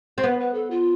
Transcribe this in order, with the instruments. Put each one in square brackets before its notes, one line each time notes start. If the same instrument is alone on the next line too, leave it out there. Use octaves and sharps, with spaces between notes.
[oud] C4
[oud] B3 [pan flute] B4
[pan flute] B4
A4
F4